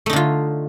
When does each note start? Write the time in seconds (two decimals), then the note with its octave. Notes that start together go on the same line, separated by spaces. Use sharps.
0.06 A3
0.10 D#4
0.13 D3
0.16 F4